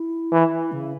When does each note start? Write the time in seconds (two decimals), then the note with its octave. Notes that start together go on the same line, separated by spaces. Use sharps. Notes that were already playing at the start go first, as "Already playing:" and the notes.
Already playing: E4
0.32 E3
0.72 C#3